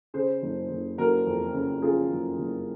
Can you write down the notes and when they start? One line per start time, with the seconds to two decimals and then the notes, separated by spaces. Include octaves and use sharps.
0.14 C#3 G#4 C5
0.42 F#1
0.70 F#1
0.98 F#1 F#4 A#4
1.26 F2
1.54 C#3
1.82 C#3 F4 G#4
2.10 F#1
2.38 F#1